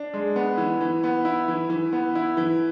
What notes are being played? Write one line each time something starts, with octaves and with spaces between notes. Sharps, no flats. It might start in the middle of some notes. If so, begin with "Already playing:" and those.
Already playing: D4
G#3
B3
E3
E3
B3
E4
E3
E3
B3
E4
E3